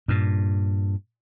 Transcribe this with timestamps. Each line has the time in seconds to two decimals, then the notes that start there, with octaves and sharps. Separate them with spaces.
0.08 G2 A#2